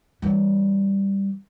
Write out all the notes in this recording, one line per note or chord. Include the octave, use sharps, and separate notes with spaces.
E3 G3